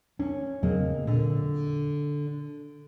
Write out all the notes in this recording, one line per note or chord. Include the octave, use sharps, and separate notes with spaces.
C#4 D4
E2 C#3 F#3 G#3 A#3 C4
A#2 D3